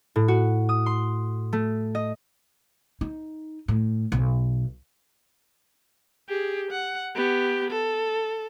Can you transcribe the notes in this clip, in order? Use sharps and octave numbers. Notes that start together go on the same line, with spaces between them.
A2
F#4
D#6
C6
A3
D#5
D#4
A2
B1
G4 G#4
F#5
B3 G4
A4